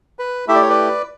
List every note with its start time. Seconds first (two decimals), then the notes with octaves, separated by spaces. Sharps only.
0.19 B4
0.48 A3 E4 G4 E5
0.55 D5
0.62 C#5
0.69 B4 D5